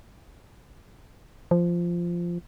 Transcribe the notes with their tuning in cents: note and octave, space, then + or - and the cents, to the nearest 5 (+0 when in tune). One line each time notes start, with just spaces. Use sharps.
F3 -10